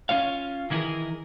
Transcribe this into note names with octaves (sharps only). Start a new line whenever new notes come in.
C#4 F4 C#5 F5
D#3 E3 E4 F#4 G#4 A#4